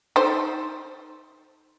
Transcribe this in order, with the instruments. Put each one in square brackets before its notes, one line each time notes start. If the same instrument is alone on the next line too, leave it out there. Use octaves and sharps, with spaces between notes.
[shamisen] D#4 A4 C5